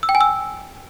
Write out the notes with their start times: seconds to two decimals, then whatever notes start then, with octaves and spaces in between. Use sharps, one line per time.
0.03 E6
0.09 G5
0.15 G#5
0.21 E6